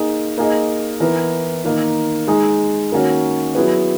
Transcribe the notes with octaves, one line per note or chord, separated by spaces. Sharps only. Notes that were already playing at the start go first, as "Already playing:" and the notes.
Already playing: A#3 D#4 G#4
A#3 D#4 G#4 D#5
E3 B3 E4 A#4
D#3 A#3 D#4
G#3 D#4 G#4 D#5
D#3 A#3 C#4 F#4 C#5
F#3 B3 E4 G#4 B4